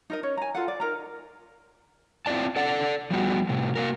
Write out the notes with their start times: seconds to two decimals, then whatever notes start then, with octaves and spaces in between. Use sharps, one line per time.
0.10 D#4 A#4 D#5
0.23 C#4 C#5
0.37 G#5 A#5
0.55 F4 A4 F#5
0.68 D5
0.80 D#4 A#4 A#5
2.26 C4 E4 F4 D5 A5
2.56 A4 D5 F#5
3.11 F3 G3 B3 F#4
3.49 A2 C3
3.76 A#3 F#4 A#4